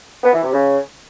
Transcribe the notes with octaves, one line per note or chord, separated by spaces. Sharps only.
B3
E3
C3
C#3